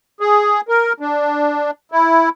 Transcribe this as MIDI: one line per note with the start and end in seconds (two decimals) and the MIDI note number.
0.21 0.61 68
0.68 0.93 70
1.00 1.71 62
1.92 2.29 64